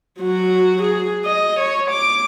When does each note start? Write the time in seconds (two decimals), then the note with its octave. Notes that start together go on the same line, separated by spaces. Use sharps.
0.21 F#3 F#4
0.83 G#4
1.25 D#5
1.60 C#5
1.91 D6